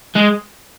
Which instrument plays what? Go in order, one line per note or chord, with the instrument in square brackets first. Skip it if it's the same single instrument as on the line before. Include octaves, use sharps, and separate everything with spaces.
[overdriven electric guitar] G#3